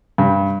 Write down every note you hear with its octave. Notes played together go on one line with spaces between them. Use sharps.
G2